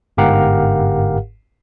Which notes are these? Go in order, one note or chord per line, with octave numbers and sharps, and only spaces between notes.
G1 G#2 G4 A#4 F5 F#5